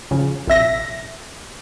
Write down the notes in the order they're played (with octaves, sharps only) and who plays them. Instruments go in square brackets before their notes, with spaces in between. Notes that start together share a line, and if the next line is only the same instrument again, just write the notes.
[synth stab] C#3 F3
A#1 C3 E5 A#6